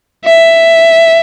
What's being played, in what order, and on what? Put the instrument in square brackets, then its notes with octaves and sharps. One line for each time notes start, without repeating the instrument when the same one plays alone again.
[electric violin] E5